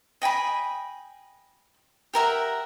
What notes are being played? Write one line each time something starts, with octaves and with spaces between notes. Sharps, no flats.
D#5 G5 G#5 B5
G4 A#4 E5 F#5